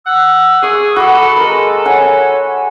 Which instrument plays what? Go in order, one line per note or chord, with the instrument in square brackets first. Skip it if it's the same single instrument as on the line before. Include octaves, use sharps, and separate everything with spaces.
[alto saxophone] F#5 [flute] E6
[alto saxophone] G#4 [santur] D5 C#6
[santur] F#4 D6 [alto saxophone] A4 [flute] B5
[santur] G#3 A#4 B4
[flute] C#5 [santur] F#5 G#5 B5